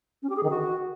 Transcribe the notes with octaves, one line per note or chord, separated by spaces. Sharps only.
C#4
G4
G#4
D#3
F#4